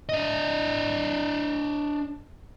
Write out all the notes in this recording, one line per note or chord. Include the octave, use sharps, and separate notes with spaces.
D4 D#5